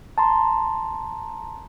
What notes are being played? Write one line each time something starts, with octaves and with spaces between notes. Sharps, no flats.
A5 A#5 C6